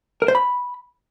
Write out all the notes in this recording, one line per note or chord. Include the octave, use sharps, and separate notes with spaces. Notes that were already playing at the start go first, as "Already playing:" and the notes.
A#4
C5
B5